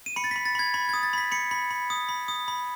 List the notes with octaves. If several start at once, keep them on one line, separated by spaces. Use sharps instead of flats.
D#7
B5 C#7
A6
B5 B6
A6
B5 G#6
B5
D#6 G#6
A6
B5 B6
B5 C#7
B5
B5
D#6
B5
D#6
B5